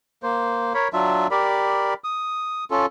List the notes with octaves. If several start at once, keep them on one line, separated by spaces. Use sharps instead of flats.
A#3 C5
A#4 C#5 B5
F#3 D4 F4 E5
G4 A#4 D5 B5
D#6
C#4 F4 A4